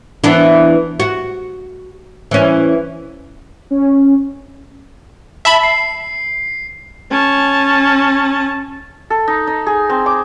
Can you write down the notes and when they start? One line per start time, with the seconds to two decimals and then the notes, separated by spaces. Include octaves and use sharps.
0.24 E3 B3 D4
1.00 F#4
2.31 E3 C#4
3.71 C#4
5.45 E5 A5 B5
5.63 C7
7.11 C#4 A5
9.10 A4
9.28 D#4
9.47 D#4
9.67 G#4
9.90 C4
10.06 D6